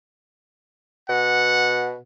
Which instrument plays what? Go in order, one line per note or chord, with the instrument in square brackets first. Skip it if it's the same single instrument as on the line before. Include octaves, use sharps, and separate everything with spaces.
[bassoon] B2 [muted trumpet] F#5